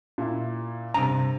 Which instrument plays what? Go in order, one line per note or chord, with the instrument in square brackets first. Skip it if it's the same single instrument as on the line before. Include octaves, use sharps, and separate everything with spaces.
[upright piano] A#2 E4
[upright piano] G2 C3 [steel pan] A#5